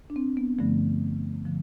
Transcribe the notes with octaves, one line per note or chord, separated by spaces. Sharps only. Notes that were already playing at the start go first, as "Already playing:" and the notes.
D4
C4
B3
G2 D3 F3 A3
D3 F3